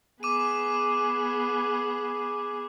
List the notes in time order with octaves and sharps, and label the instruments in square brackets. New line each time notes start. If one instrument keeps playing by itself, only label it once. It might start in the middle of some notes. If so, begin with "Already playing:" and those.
[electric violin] B3 G#4 [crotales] D6 D#7